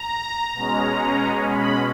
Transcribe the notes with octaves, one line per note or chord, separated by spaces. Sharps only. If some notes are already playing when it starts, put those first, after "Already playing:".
Already playing: A#5
B2 G#3 C#4
B5